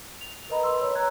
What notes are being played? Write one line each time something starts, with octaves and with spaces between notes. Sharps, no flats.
F7
A#4 B4 D#5 A#5 B5
B4 C6 E6
C#5
A#5 F#6 G#6